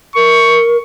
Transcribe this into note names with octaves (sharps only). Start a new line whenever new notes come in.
A#4 C#6